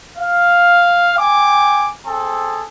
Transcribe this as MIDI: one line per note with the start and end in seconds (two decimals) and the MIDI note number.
0.18 1.13 77
1.18 1.88 79
1.18 1.88 80
1.18 1.88 86
2.06 2.63 60
2.06 2.63 68
2.06 2.63 69